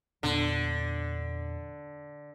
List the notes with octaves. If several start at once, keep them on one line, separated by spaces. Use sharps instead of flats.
E2 A#2 D3 B3